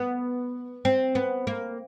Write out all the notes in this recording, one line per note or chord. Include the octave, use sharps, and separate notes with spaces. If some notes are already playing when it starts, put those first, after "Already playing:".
Already playing: B3
C4
B3
A#3